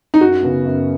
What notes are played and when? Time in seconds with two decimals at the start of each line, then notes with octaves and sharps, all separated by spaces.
0.14 D#4
0.21 F#2 F#4
0.43 C#3 B3
0.65 F#2